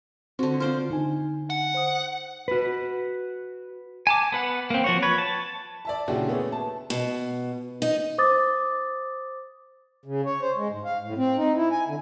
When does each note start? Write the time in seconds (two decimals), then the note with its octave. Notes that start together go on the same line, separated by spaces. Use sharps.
0.39 D3 C4 F#4
0.60 F4 C5 D5
0.90 D3 D#4 G#5
1.50 F#5
1.74 C5 D#6
2.48 F#4 B4
4.07 G#5 A5 D6
4.32 B3 B4 F#5
4.70 A#3 C4
4.84 F3 F#4 C#5
5.02 B4 C#5
5.18 A5
5.85 D5 E5 A5
6.08 A#2 C#3 D4 E4 F#4 G4
6.28 A3 B3 C#4 G#4
6.52 A5
6.90 B2
7.82 D#4
8.18 C5 D6 D#6 A6
10.05 C#3
10.26 C#5
10.42 C5
10.57 G#3
10.70 G#2
10.85 F5
11.04 A2
11.17 C4
11.37 D#4
11.56 E4
11.71 G#5
11.88 D3